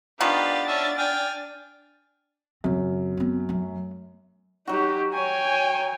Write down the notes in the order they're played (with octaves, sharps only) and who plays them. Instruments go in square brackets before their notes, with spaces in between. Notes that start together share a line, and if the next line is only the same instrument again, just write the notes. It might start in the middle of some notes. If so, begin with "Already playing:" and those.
[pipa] D#3 F3 B3 [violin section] D4 A6 [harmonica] G4 B4 F5
[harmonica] C#4 E5 A5
G5 G#5 F6
[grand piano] F#2 [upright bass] C#3 C4
[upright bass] B3 C4
F#3 A3
[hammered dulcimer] F#3 F#4 [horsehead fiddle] D#4 G4
[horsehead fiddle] C#5 G#5 [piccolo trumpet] G5